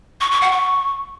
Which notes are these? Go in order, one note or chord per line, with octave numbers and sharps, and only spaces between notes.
C#6
C#6
F#5
C#6